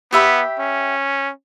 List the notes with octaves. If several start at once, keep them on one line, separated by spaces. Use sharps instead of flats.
B3 G4 E5 B5
C#4